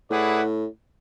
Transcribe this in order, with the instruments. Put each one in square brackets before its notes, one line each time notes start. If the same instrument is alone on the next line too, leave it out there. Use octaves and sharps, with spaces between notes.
[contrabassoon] A2 [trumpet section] E4 G#4 B4 D5 F#5